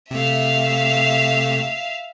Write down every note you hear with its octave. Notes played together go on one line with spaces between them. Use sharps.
C3 A3 E5 F5